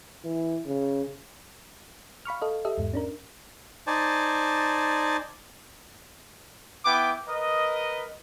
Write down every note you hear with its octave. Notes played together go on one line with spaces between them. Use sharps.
E3
C#3
F5 B5 C#6 F6
A4 D#5 F5
G4 A4 D#5 E5
E2 G#2
C#4 D4 A#4
D#4 C5 D5 G#5 A5
B3 E4 G5 D6
A#4 B4 D#5